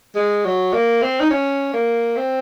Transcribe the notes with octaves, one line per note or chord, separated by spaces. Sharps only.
G#3
F#3
A#3
C4
D#4
C#4
A#3
C4